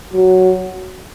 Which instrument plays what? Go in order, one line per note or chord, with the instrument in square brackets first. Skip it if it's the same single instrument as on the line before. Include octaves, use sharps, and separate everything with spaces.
[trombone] F#3